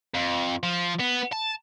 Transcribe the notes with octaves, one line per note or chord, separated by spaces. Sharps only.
F2
F3
B3
A5